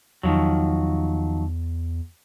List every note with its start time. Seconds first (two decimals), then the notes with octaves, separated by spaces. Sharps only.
0.23 E2 D#3 F3 F#3